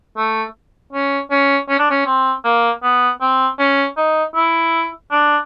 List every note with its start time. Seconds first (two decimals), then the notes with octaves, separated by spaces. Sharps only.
0.17 A3
0.93 C#4
1.31 C#4
1.69 C#4
1.79 D4
1.91 C#4
2.06 C4
2.44 A#3
2.83 B3
3.21 C4
3.59 C#4
3.97 D#4
4.35 E4
5.11 D4